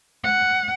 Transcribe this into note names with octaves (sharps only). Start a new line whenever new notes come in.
F#5